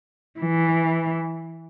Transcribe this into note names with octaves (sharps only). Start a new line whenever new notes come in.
E3